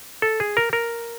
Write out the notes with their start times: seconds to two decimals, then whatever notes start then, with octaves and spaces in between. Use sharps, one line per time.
0.22 A4
0.40 G#4
0.57 A#4
0.73 A#4